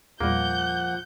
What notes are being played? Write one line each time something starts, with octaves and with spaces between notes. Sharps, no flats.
E2 A#2 F3 G3 A#3 F#5 G6